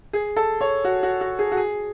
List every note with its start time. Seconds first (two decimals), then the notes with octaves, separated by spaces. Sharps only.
0.13 G#4
0.36 A4
0.61 C#5
0.85 F#4
1.03 F#4
1.21 F#4
1.39 G#4
1.52 F#4
1.57 G#4